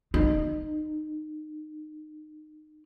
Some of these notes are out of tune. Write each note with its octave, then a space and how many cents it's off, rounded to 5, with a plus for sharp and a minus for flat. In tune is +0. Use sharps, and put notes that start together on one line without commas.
D#4 -25